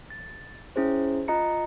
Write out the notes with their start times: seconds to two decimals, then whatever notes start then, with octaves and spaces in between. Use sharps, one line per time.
0.10 A6
0.76 C#4 E4 G#4 C5
1.28 F4 D#5 A#5 C#7